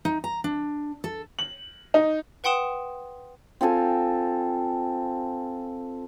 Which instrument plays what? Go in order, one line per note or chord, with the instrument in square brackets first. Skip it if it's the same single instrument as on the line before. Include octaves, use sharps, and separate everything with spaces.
[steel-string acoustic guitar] D#4
A#5
D4
A4
[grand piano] F#7
D#4
[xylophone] B4 F#5 G5 C6 D#6 E7
[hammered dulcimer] C4 F4 A4 G#5